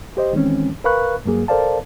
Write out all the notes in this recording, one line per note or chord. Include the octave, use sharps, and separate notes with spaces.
G4 C5 D#5
D#3 E3 G#3 C4 C#4
A#4 B4 F5 B5 C#6 F#6
G2 F#3 A#3 G#4
A4 A#4 C5 D5 F5 A5